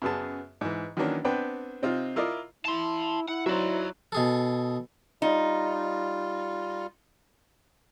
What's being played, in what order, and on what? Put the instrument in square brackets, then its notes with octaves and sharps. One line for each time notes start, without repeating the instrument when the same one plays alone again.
[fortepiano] F#2 C#3 B3 G#4 A5
G#2 E3
D#3 E3 F#3 A#3 C#4 D4
B3 C4 D4 B4 G5
C3 C4 D#4 F4
E4 F4 A#4 D5 D#5
[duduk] E4 [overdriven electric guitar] A5 C6
[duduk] E4 [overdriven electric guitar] F#5
[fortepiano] F#3 D#4 C5 [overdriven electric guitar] D5 E5
[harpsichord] B2 G#4 A4
[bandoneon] G3 F4 [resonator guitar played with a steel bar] D#4